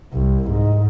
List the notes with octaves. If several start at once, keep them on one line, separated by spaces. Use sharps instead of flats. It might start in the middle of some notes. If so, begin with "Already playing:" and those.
C2
G#2